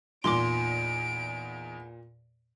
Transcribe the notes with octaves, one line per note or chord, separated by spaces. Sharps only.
E2 A#2 D#4 C6 D6 D7